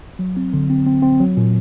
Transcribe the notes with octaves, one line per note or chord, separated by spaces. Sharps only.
F#3
C4
D3
C4
C4
C4
F#3
A#2